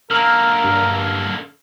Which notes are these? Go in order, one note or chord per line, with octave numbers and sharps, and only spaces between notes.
D3 A#3 A#4 E6 F6
G2